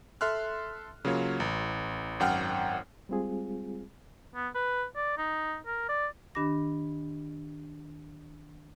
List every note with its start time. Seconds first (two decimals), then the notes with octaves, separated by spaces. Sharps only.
0.21 A4 E5 C6 F6 F#6
1.05 C#3 F#3 A#3 F4 C#5
1.40 A1
2.20 G#1 F#2 F#5 G5 F6
3.09 G3 G#3 C4 F4 G#4
4.35 B3
4.55 B4
4.96 D5
5.18 D#4
5.66 A#4
5.89 D5
6.35 D#3 D4 G4 B5 D6 A#6